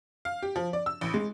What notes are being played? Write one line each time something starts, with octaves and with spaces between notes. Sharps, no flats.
F5
G4
F3
D5
E6
A1
G#3